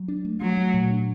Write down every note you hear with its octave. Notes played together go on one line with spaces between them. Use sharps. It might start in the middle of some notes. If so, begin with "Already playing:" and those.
Already playing: F#3
D4
A3
F#3 A3
A3
A#2
D4